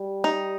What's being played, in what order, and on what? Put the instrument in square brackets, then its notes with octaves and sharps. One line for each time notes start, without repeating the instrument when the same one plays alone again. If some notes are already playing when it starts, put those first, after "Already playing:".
Already playing: [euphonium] G3
[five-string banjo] D#4